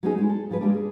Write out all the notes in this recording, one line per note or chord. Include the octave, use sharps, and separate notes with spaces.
F#3 A3 B3 C#4 D#4 G#4
G#3 E4
A4
G#2 F3 G#3 B4
G3 G#3 A#3 D4
G#4